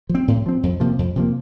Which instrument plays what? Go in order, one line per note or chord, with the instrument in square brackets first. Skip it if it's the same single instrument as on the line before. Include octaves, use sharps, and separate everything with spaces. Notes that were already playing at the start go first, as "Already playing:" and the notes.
[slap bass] F3
C4
A2
F3 C4
F2
C3 F3 A#3
F2
C3 F3 A#3